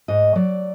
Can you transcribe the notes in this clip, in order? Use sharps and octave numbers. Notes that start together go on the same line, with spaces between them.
G#2 D#5
F#3 D5